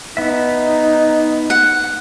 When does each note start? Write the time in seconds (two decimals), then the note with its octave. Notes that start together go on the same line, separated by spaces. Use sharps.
0.17 B3 D#4 E5
1.50 F#5